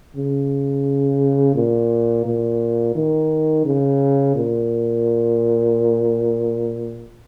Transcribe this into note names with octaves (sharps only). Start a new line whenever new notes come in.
C#3
A#2
A#2
D#3
C#3
A#2